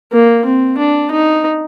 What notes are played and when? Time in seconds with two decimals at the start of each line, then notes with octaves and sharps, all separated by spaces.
0.12 A#3
0.45 C4
0.78 D4
1.12 D#4